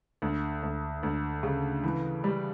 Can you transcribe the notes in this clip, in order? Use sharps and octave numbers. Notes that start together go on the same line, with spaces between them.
D2
D2
D2
C#3
E3
G3